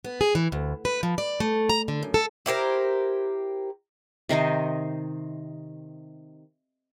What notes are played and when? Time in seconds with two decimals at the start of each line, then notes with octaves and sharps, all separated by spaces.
0.04 B3
0.21 G#4
0.35 E3
0.52 D2
0.85 B4
1.03 F3
1.18 D5
1.40 A3
1.69 A#5
1.88 D3
2.03 F#2
2.14 A4
2.46 E4 G4 A#4 C5
4.29 C3 D#3 D#4 C5